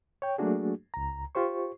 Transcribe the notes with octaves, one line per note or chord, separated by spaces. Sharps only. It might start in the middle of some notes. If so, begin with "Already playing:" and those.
C#5 G5
F#3 A3 A#3 D4 F#4 G#4
C#2 A#5
F4 G4 C5 C#6